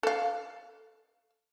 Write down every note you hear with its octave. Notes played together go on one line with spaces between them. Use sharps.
A4 F5